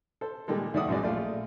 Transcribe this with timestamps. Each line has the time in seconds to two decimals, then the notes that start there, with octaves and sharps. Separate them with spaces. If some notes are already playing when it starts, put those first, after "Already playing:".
0.21 A4 C5
0.48 A#2 D#3 G3 G#3 A4
0.74 D#2 G3 D5 E5 F#5 D#6
0.88 A#1 F#2 E3 G#3 F#4 D5
1.03 A#1 A3 F4 D5 F5